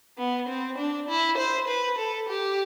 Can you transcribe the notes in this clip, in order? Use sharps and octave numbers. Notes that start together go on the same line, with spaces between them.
B3
C4
D4
E4
C5
B4
A4
G4